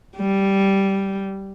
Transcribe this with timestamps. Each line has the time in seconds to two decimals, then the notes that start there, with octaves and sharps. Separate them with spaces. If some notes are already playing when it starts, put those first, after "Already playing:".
0.17 G3